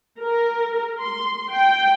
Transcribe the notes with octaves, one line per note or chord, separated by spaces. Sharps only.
A#4
C6
G5